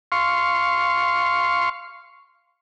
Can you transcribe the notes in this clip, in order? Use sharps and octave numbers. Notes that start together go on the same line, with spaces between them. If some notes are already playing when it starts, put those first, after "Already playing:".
F5 C6 C#6